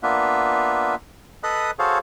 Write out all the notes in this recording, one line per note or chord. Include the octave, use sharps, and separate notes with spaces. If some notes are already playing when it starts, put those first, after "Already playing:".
A#3 B3 D4 F4 B4 E5
A4 B4 D#5 B5 D#6 F#6
F#4 G#4 A4 C5 C#5 F5